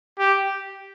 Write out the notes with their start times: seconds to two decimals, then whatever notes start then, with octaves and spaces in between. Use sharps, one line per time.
0.19 G4